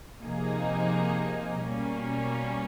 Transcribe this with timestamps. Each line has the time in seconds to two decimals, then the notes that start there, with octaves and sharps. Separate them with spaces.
0.23 C3 F3 A#3 D#4 G#4
1.65 B2 G3 A#3 C#4